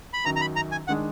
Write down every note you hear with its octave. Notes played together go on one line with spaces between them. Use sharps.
B5
F#2 D#3 F#3 A#5
A#5
B5
A#5
G#5
D#3 G#3 D4 F#5